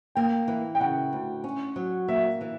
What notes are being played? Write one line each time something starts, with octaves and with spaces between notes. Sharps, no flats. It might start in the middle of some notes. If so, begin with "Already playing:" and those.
A#3 G5
E3
G5
C#3 F#5
D2
C#4
F#3
A#3 E5
E3